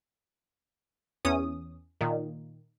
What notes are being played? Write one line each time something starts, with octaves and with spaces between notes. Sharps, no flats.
E2 C#4 D#6
A#2 D#3